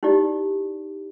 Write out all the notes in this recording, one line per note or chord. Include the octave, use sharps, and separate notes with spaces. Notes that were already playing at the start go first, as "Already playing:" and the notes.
D#4 E4 G4 D5